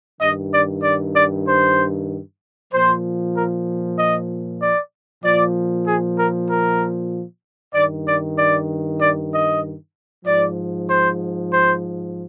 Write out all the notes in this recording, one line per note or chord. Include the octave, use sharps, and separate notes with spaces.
G2 D#3 D#5
D5
D5
D5
C5
A#2 F3 C5
A#4
D#5
D5
A#2 F3 D5
G#4
A#4
A#4
G2 D#3 D5
D5
D5
D5
D#5
G#2 F3 D5
C5
C5